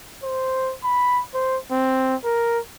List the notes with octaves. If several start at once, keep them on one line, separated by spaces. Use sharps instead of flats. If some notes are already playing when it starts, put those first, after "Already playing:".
C5
B5
C5
C4
A#4